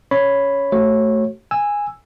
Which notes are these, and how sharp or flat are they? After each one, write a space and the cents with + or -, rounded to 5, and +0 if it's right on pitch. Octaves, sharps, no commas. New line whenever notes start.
C#4 +15 C#5 +0 B5 +0
A3 +0 F#4 +30 C#5 -25
G#5 -10 E6 +0